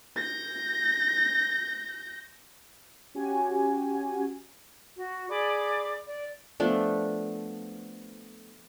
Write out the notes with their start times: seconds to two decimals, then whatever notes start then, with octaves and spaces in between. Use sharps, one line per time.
0.16 G6 A#6
3.15 C#4 F#4 G4 G#5
4.97 F#4
5.30 G#4 D5 B5 D6
6.08 D5
6.60 F3 A3 B3 D4